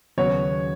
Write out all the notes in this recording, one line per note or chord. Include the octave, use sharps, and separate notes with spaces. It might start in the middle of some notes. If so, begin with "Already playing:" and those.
D#2 C#3 F#3 B3 F#4 C#5